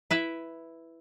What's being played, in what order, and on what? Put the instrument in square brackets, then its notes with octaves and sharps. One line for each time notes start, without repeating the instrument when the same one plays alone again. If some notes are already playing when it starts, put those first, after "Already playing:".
[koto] E4 B4 E5